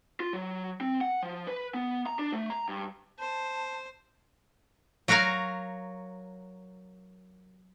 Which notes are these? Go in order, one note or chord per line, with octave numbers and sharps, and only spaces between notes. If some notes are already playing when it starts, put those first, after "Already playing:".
F4
F#3
C4
F#5
F3
B4
B3
A#5
D4
A3
A#5
G2
C5 A5
F#3 F#4 A#4 C#5 F5